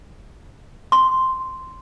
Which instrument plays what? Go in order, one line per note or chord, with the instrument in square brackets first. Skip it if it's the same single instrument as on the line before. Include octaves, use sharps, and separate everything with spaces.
[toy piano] C6